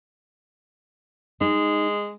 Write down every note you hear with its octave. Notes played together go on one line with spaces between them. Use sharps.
G#3 D#4